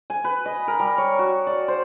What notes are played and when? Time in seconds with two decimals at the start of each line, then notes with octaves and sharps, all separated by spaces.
0.10 G#5
0.24 B4
0.46 D#5
0.68 A#4
0.80 G3
0.98 C#5
1.19 F#4
1.47 D5
1.68 C5